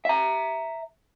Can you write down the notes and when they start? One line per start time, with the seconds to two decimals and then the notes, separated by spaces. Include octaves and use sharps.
0.05 E5 A#5